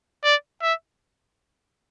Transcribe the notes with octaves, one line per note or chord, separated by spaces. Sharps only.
D5
E5